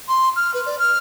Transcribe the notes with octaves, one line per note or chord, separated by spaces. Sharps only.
C6
F6
B4
D5
F6